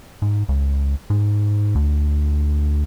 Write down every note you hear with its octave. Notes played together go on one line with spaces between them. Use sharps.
G#2
C#2
G#2
D2